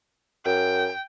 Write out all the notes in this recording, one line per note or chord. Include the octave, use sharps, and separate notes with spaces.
F#2 G5